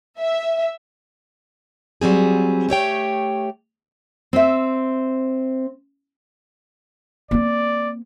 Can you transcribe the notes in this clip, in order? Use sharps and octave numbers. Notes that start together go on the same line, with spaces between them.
E5
F#3 G3 C4 G#4
A3 G4 C#5 G5
C4 E5
A#3 C4 D5